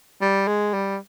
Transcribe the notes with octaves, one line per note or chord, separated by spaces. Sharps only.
G3
G#3
G3